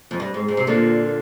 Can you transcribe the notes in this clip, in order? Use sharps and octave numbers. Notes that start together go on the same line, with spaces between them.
F2
G2
G#2
G#2
C3
A#2 D3